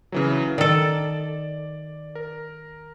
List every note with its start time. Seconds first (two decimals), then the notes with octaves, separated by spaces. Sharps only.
0.12 C#3 E3 F#3
0.58 D#3 A4 D5
2.15 A#4